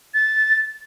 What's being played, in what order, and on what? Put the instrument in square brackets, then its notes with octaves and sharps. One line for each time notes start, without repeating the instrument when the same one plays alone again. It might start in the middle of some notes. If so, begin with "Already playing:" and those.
[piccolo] A6